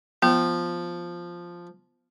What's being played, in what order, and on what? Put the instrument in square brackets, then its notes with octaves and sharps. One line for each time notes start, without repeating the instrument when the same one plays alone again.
[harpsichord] F3 [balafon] B3